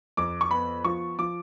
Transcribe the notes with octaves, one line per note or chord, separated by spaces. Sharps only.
F2 D6
C#6
B3 B5
F3 C#6
F3 D6